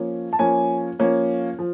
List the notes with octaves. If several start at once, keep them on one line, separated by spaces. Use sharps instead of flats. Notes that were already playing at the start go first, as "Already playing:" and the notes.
Already playing: F3 A#3 C#4
A5
F3 A#3 C#4 G#5
F3 A#3 C#4
F3